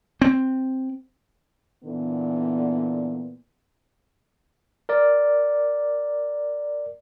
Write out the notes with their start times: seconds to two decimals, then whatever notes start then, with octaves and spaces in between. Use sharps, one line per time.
0.22 C4
1.84 A#2 D3 E3 B3
4.89 A#4 D5